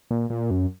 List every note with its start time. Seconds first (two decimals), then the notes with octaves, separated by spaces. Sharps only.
0.11 A#2
0.30 A#2
0.51 F#2